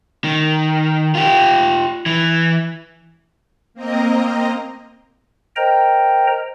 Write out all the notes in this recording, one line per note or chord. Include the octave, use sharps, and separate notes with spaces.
D#3
F4 G4
E3
A#3 C4 A#4 D#5
A#4 C5 D#5 G5 A#5